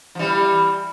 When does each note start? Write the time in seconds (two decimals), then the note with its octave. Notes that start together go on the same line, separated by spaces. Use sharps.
0.15 F3
0.19 E3 G3